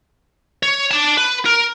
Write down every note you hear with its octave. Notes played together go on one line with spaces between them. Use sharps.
C#5
D5 A5
B4
A#4